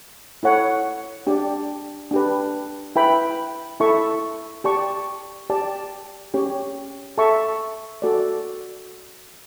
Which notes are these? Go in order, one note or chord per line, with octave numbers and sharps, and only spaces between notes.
E4 A4 C#5 F#5
D4 G4 D5
D4 G4 B4
E4 B4 E5 G5 B5
E4 A4 E5 A5 C#6
G4 D5 A5 C#6
G4 D5 A5
C#4 G4 C#5
A4 E5 A5 C#6
F#4 A4 D5